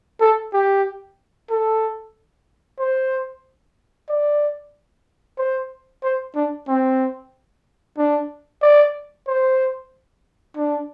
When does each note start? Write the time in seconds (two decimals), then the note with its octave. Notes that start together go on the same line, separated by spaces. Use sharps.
0.21 A4
0.53 G4
1.50 A4
2.79 C5
4.09 D5
5.38 C5
6.04 C5
6.36 D4
6.68 C4
7.98 D4
8.62 D5
9.28 C5
10.57 D4